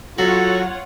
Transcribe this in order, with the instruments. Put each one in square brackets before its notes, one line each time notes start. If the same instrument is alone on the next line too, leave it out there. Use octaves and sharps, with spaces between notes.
[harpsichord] F#3 [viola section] F4 C#5 F#5 [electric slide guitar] F#4 [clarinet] A4